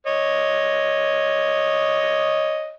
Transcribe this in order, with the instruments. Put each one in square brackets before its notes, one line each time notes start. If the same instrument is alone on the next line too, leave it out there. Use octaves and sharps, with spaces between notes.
[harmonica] C#5 D#5